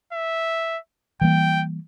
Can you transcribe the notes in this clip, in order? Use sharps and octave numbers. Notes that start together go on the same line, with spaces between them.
E5
E3 G3 A#3 G5